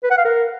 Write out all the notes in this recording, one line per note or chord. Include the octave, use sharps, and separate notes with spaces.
B4
F#5
F5
A#4